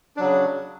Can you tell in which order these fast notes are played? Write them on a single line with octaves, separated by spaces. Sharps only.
D4 F#3 C#3